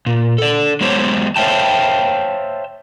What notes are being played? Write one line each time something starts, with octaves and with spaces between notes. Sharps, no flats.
A#2
A4 D5
F#3 G#3 B3 G4 C5 C#5
C5 C#5 E5 F5 G5 A5